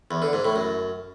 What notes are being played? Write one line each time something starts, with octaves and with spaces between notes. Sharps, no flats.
E2
D3
G#2
A2
F#2